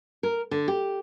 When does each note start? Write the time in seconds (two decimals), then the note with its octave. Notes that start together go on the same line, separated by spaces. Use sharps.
0.23 A#4
0.51 D3
0.68 G4